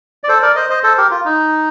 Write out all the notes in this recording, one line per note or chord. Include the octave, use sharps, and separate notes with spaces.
D5
A4 C5
A#4 D5
C5 D#5
C5 D#5
A4 C5
G4 A#4
F4
D#4